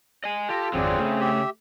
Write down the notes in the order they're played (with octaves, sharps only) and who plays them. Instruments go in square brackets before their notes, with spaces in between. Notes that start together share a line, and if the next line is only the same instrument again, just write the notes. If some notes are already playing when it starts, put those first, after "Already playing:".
[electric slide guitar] D#5 G#5
[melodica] F4 [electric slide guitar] G4 [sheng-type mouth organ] A4 A5 [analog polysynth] A#6
[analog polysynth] G#1 F2 D5 [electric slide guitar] D3 F#3 [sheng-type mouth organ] C4 G#4
[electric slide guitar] C#3 [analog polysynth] A3
[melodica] G4 E5